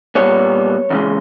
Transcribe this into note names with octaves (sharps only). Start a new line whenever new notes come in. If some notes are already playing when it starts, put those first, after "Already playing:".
A#2 G3 B3 C#5
E2 C#3 G#3